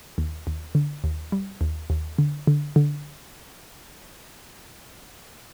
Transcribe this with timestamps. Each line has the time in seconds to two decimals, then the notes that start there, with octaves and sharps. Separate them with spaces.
0.18 D#2
0.47 D#2
0.75 D3
1.04 D#2
1.32 G3
1.61 D#2
1.90 D#2
2.18 D3
2.47 D3
2.76 D3